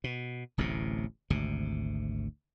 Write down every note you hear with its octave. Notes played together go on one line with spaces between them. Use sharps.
B2
D1 A1 A2 C3
G#1 D2 C3